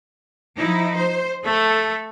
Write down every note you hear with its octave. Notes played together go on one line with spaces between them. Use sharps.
F3 D#4 E4
C5
A3 A4